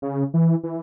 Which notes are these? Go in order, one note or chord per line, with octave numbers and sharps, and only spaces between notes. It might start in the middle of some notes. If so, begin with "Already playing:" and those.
C#3
E3
E3